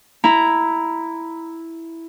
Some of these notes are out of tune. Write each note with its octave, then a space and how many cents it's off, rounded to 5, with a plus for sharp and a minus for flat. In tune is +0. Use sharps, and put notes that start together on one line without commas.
E4 +0 A#5 +0